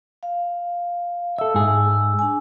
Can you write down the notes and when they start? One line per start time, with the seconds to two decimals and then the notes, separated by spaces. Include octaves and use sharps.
0.23 F5
1.38 A4 E5 E6
1.55 G#2 G#4
2.19 D4 G#5